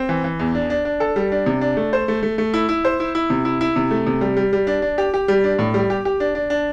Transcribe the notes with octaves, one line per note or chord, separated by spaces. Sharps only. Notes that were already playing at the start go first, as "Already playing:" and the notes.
Already playing: C4
E3
E3
E2
D4
D4
D4
A4
G3
D4
C3
D4
A3
C5
A3
A3
A3
E4
E4
C5
E4
E4
C3
E4
E4
C3
A3
C3
G3
G3
G3
D4
D4
G4
G4
G3
D4
A2
G3
G4
G4
D4
D4
D4